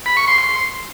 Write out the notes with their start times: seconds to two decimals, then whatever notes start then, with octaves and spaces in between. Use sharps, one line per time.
0.06 B5
0.17 C#6
0.27 C6
0.38 C6